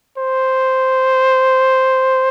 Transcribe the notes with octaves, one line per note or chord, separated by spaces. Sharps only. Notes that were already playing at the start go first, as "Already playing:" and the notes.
C5